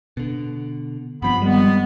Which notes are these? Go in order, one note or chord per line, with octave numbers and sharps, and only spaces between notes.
B2 D3
G2 F3 B3 C4 B5
D#3 G3 G#3 B3